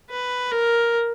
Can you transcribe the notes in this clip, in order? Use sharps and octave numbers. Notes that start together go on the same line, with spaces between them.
B4
A#4